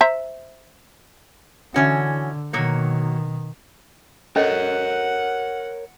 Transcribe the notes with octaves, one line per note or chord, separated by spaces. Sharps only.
C5 E5 A#5
D3 E3 C#4 F#4
B2 D#3 F#3 A#3 C#5
C#4 A4 A#4 C#5 D#5 F#5